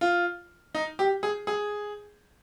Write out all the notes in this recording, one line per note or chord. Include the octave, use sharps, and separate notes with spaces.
F4
D#4
G4
G#4
G#4